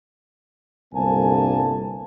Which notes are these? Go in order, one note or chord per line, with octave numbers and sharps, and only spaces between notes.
G1 C2 D3 A#3 G#5 A5